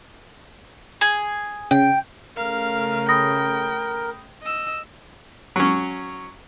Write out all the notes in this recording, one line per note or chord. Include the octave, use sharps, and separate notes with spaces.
G#4
C#3 G5
C#3 A3 A#4 F5
G5 B5 D#6 A#6
D#5 E6
F#3 C#4